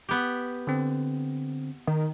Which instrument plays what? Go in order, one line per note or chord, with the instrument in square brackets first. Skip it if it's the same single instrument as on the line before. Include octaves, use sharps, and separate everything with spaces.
[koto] B3 G4
[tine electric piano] D3 C4
[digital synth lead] D#3